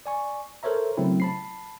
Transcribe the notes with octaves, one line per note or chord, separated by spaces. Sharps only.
D5 G#5 C#6
A4 A#4 C5 C#5 E5 A#5
C#3 F#3 A3 C4 E4
A5 B5 C7